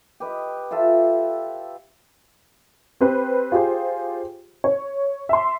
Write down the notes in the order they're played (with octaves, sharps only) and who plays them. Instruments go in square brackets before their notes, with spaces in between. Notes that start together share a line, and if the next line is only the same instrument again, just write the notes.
[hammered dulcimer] G4 B4 D#5
F4 A4 E5
[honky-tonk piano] C4 G4 B4 C5
F4 G4 G#4 C5
C#5
E5 C6